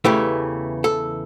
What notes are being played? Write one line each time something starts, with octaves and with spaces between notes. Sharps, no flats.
E2 C#3 E3 A3 G4
A4